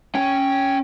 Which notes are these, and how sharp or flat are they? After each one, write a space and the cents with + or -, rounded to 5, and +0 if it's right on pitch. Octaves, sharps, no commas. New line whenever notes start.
C#4 +0 G5 +0